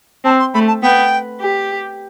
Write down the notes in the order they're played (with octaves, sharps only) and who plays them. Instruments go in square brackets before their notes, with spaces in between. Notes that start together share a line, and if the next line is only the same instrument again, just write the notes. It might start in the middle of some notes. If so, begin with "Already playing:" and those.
[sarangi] C4 [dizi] A5
[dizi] C6
[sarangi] A3 [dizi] B5
[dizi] A5
[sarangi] B3 [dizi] G5
[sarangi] G4